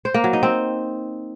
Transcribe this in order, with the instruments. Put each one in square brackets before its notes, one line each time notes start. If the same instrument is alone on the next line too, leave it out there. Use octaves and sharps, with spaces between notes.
[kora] C5
A#3
F#3
D#4
C4